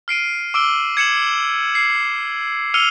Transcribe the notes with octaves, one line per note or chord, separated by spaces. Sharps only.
F6 C7 D7 D#7
D6 E6 D7 G7
G#6 C#7 E7 F#7
C7
E6 F6 C#7 D#7 F7 G7